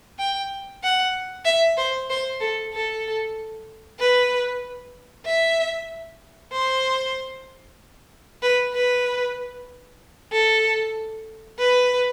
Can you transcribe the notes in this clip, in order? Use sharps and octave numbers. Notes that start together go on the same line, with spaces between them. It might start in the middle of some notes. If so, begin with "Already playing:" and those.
G5
F#5
E5
C5
C5
A4
A4
B4
E5
C5
B4
B4
A4
B4